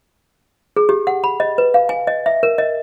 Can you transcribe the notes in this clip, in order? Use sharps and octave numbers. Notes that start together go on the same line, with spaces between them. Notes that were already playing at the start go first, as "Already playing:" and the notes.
G#4
G4
F#5
B5
D#5
B4
F5
G#5
D#5
E5
A#4
D#5